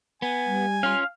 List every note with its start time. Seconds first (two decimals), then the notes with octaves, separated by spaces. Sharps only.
0.22 B3 G#5
0.46 G3
0.83 C#4 F4 F5